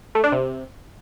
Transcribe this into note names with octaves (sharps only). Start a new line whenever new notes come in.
A3
D4
C3